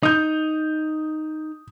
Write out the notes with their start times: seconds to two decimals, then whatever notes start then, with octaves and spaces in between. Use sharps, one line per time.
0.03 D#4 D#6 G6